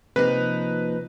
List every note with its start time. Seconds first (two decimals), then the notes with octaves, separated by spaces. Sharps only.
0.16 C3 F3 A#3 D#4 B4